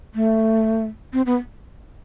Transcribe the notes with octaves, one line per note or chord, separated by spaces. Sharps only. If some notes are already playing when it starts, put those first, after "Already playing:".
A3
C4
B3